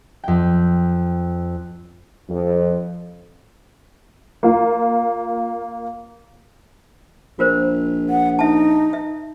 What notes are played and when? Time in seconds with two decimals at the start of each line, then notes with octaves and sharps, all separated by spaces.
0.24 F2 G5
2.29 F2
4.43 A#3 F4
7.39 A#1 F4 A#4 C5
8.09 F#5
8.39 D#4 E5 A5
8.93 E5